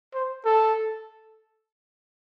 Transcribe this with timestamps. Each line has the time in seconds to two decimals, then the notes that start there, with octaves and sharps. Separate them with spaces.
0.14 C5
0.45 A4